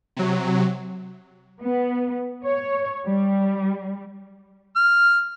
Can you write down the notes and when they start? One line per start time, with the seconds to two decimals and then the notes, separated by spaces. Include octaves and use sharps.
0.17 C3 F#3
1.61 B3
2.44 C#5
3.06 G3
4.76 F6